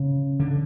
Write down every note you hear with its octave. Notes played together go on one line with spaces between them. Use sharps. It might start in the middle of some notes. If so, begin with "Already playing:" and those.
Already playing: C#3
D3